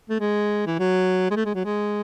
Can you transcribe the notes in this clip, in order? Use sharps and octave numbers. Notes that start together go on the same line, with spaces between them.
A3
G#3
E3
F#3
G#3
A3
G#3
F#3
G#3